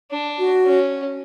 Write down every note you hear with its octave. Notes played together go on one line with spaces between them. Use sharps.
D4
F#4
C#4